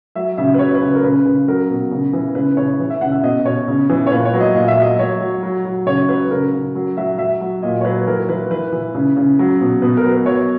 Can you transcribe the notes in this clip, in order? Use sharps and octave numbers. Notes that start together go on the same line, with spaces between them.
F#3 E5
C#3 E5
B4
F#3 C#5
B4
C#3
A#4
C#3 B4
C#3
F#3 A#4
B2
C#3
E3
C#3 B4
C#3 C#5
E3
E5
C#3 F#5
E5
B2 D#5
B2 C#5
C#3
E3
C#5
A#2 B4
C#5
F#3
D#5
A#2 D#5
E5
F#3 D#5
F#3 C#5
F#3
F#3
F#3
C#3 C#5
F#3 B4
C#3 A#4
C#3
F#3
F#3 E5
F#3 E5
F#3
A#2 D#5
C#5
F#3 B4
E3 A#4
E3 B4
E3 B4
E3
C#3
C#3
F#3
B2
B2 B4
A#4
F#3
B4
F#3 C#5